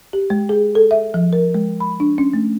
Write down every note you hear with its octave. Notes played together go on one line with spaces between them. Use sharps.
G4
G#3
G#4
A4
E5
F3
A#4
G#3
B5
D4
C#4
A3